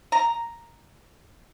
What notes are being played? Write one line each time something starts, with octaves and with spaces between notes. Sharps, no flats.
A#5